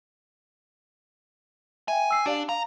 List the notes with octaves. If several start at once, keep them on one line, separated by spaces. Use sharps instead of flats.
E5 G5 G#5
E6 C7
D4 G4 D5 F5
F5 A#5